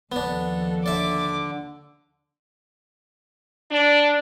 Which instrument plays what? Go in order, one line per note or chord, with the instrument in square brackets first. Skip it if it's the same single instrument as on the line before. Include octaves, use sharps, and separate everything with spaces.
[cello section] D#2 F3 A4 [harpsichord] B3 D4
[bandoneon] D3 [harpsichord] D5 E5 [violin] D6
[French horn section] D4